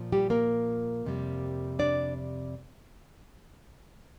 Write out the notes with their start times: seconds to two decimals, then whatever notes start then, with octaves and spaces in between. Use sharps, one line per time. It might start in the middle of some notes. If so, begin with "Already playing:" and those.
Already playing: A#2 F3
0.12 G3 G4
0.30 A#3 A#4
1.06 F2 C3 G3 A#3
1.79 D4 D5